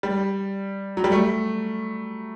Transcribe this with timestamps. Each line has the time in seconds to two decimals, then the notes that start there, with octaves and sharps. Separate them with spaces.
0.03 G3
0.97 F#3
1.04 G3
1.12 A3